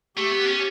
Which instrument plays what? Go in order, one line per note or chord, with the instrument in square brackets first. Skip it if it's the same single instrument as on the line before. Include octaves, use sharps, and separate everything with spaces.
[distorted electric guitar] A3 [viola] G4
[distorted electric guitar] B3
C#4